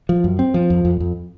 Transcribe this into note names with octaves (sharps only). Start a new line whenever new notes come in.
F3
F#2
C4
F3
F2
F2
F2